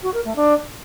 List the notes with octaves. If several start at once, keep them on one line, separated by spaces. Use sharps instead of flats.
F#4
A#4
A3
D4